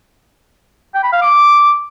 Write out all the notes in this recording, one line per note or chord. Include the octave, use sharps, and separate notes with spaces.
G5
B5
F5
D6